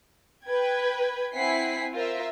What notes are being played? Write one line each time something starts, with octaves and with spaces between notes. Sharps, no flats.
B4 G5 G#6
C4 E4 F#5 G#5 B6 C7
F4 A#4 C5 E5